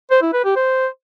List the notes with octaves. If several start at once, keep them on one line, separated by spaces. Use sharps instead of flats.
C5
E4
B4
G4
C5